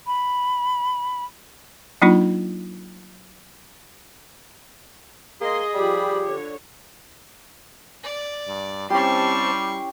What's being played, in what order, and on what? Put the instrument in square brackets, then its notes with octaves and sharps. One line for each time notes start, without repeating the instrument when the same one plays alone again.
[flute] B5
[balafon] F#3 A#3 D4 D#4 F4
[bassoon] A#3 [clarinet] G#4 [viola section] D#5 C6
[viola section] F3 B5 [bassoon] G3 [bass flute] G4
[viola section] D3 C#5
[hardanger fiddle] D5
[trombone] G2
[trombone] G3 [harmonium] C4 A5 [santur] C#4 E4 G4 [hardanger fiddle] C6 C#6